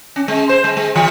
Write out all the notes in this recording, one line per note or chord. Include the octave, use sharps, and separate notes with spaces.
C#4
G#3
C5
G#3
G#3
E3